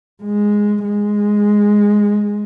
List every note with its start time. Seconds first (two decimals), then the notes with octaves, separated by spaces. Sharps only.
0.23 G#3
0.84 G#3